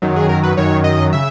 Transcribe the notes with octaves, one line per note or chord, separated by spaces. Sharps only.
F#2 D#3 F#3
G#4
A#4
B4
F#2 D#3 F#3 C#5
D#5
C#3 E5